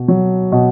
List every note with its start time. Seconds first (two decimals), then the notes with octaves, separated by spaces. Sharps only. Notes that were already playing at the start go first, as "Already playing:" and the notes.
Already playing: B2
0.08 F#3
0.52 B2 D#5